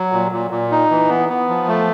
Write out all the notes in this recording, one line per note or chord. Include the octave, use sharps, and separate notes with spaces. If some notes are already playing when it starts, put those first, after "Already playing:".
Already playing: F#3
A#2
A#2
A#2
D#4
E3
B3
B3
F3
A3